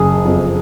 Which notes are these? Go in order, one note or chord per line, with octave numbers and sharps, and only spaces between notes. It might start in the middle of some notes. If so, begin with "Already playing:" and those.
Already playing: F#1 G#4
F2